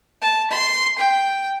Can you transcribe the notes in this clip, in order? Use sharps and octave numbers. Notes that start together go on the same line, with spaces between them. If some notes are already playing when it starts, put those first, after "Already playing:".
A5
C6
G5